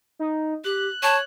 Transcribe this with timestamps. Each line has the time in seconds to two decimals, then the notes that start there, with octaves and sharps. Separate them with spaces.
0.19 D#4
0.64 G4 F#6
1.03 C#5 A5